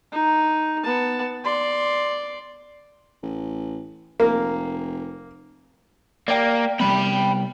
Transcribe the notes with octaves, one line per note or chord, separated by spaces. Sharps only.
D#4
B3 A5
D5 C6
A1
F1 A#3
A#3 D5 G5
C3 G3 B3 G5 B5